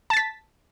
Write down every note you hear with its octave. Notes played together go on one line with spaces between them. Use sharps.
A5 A6 B6